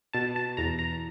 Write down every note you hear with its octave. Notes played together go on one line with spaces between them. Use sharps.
B2 A5
A5
E2 A#5
A#5